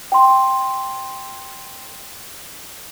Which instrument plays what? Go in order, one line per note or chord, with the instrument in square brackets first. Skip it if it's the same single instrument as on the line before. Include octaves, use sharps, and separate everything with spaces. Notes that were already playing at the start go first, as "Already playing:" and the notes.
[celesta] G5 C6